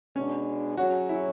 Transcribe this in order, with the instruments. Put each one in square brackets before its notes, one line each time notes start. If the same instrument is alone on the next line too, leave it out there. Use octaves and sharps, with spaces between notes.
[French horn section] B2 G#3 B3 D4 [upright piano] C#4
[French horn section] F#3 C#4 G#4 C#5 [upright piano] F#4
[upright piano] E4